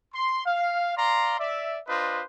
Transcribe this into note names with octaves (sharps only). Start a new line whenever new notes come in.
C6
F5
D5 F5 A#5 C6
D5 E5
D4 F4 B4 C5 D#5